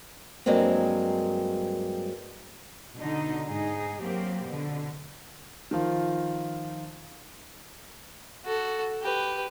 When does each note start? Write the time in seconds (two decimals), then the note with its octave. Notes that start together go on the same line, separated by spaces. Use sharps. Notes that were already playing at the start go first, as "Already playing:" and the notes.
0.46 G2 F#3 G#3 A#3 C4
2.98 B2 D3 D#4
3.46 G#2 D#4 G#4
4.02 F#3 A#3 C4 G4
4.46 B2 D3
5.71 D#3 F3 F4
8.45 F#4 A4
9.03 G4 B4